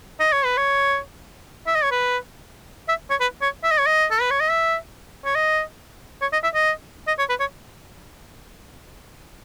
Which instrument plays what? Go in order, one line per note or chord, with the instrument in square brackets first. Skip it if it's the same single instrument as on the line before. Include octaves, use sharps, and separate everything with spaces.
[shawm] D#5
C#5
B4
C#5
E5
D#5
C#5
B4
E5
C#5
B4
C#5
E5
D#5
C#5
D#5
A4
B4
C#5
D#5
E5
C#5
D#5
C#5
D#5
E5
D#5
D#5
C#5
B4
C#5